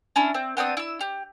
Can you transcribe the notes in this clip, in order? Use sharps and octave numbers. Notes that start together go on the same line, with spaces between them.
C#4 D4 E4
C4
B3 C4 D4 D#6
E4 E6
G4